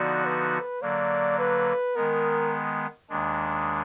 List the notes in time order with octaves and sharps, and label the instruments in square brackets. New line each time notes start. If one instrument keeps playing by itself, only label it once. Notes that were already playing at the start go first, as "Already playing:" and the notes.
Already playing: [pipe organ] D3 F3 B3 D#4 F#4 [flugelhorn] D5
[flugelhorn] B4
[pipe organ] D3 F#3 A#3 [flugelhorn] D5
[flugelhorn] B4
[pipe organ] D#3 G#3 B3 [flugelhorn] A#4
[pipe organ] D#2 D#3 G#3 D4